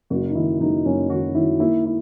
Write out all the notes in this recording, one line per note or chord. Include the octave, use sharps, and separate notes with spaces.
F#1 F#4
D#4
D#3 E4
F#1 D#4
F#1 C#4
D#3 F#4
D#3 E4
A#3 E4
E4